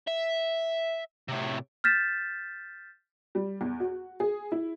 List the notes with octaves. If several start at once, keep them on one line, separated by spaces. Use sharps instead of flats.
E5
A2 C3
F6 G6 A6 B6 E7
G3
E2
F#4
G#4
E4